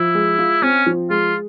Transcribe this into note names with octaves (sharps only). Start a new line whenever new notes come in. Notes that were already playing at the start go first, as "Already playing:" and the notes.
Already playing: F3 E4
G#3
F4
C4 C#4
F3
G#3 F4